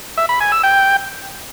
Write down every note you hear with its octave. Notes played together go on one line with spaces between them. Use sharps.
E5
B5
G#5
E6
G5